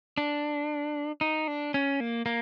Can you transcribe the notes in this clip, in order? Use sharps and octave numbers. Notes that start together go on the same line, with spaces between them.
D4
D#4
D4
C#4
A#3
A#3